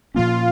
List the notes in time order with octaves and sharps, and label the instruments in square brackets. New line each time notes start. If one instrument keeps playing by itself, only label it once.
[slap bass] A#2 F3 A#3 C#4 [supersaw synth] F4